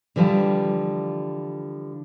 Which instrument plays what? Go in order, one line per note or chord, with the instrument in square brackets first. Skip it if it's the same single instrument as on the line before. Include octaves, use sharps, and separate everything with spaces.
[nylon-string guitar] D3 E3 F3 G3